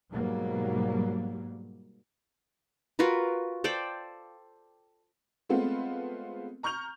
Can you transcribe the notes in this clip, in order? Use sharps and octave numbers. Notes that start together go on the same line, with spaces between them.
G#2 B2 F#3 G3 A#3
F4 F#4 A#4 B4
A4 C5 D5 G5
G#3 A3 B3 C4 F4
A#5 C#6 F6 G6 F7